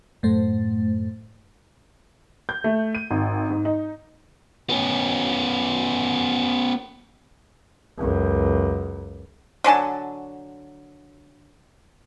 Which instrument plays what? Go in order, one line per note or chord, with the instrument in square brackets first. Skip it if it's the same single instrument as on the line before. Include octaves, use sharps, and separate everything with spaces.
[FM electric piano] F#2 A2 A3 C5 A6
[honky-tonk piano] G6
A3
D#7
G#1
G#2
D#4
[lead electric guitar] B3 C#4
[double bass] C#2 F#2
[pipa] D3 F#3 G#5 A5